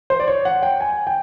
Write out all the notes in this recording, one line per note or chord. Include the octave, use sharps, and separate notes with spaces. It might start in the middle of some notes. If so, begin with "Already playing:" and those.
C5
D5
C#5
F#5
G5
G#5
G5